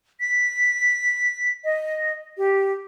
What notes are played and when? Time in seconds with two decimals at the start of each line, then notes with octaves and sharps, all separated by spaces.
0.20 B6
1.64 D#5
2.38 G4